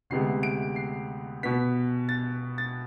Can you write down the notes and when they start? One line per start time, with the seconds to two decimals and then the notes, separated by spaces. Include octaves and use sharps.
0.10 D2 C3 G#3 B3 C7
0.43 D7
0.76 C7
1.43 B2 B3 B6
2.09 A6
2.58 A6